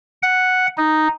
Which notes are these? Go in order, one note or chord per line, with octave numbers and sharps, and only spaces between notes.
F#5
D#4